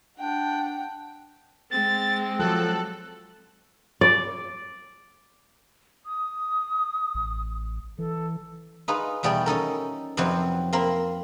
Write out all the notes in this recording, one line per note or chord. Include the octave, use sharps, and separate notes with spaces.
D4 F#5 G5
G#3 C4 A6
F3 F#3 A4 F#6
D5
D#6
A1
E3 A4
D#4 F4 G#4 B4
E2 B2 G3 F#4 G#4 G5
C#4 D#4 A4 A#4
F2 C3 F3 F#3 C4 B4
A#3 C4 A#4 B5